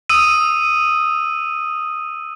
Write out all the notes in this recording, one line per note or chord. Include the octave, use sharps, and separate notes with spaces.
D#6 E6 D#7